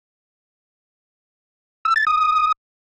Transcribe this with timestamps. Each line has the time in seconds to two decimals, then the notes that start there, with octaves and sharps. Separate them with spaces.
1.85 E6
1.96 A6
2.07 D#6